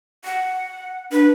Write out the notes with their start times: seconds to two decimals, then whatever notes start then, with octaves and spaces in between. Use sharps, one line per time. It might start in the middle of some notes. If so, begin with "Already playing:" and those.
0.24 F#5
1.12 D4 B4